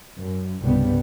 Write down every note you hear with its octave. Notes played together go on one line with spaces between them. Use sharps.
F#2
G1 C2 G2 C#3 G3 B3